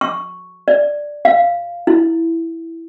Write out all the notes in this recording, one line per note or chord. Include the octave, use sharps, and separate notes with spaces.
C#6
D5
F5
E4